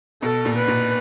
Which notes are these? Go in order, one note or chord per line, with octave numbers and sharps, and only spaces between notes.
B2 A4
A#2
B4
A#2